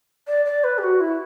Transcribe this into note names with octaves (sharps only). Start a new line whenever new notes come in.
D5
D5
B4
G4
F#4
E4